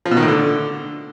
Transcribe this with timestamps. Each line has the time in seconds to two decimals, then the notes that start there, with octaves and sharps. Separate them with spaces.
0.05 F3
0.11 B2
0.17 D#3
0.22 A2
0.28 D3